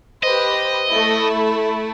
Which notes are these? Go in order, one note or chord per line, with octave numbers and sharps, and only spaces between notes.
G4 B4 C5 D#5
A3 E4